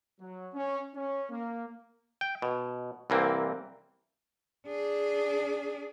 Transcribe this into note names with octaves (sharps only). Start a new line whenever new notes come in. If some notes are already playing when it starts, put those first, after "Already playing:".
F#3
C#4
C#4
A#3
G5
B2
C2 E3 A#3 C4
D4 G#4